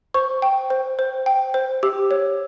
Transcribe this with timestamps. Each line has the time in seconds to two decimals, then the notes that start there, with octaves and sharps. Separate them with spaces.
0.14 C5 C#6
0.42 G5
0.70 C5
0.99 C5
1.26 G5
1.54 C5
1.83 G4 E6
2.11 C#5